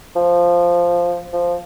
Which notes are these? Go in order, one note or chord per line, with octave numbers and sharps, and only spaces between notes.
F3
F3